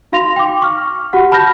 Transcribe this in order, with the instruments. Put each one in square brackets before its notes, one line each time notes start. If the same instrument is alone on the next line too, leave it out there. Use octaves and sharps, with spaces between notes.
[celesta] D#4 F#4 F5 C6 A#6 F7
G5 D6
C#6 F6
F#4 G4 F#5
A5 B5 F6 G6 A#6